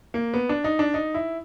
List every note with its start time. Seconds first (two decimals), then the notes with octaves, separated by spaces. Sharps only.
0.14 A#3
0.34 B3
0.49 D4
0.64 D#4
0.79 D4
0.94 D#4
1.14 E4